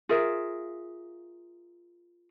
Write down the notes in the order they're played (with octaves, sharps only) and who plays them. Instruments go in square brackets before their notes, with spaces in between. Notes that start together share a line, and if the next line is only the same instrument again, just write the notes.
[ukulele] F4 G#4 A#4 E5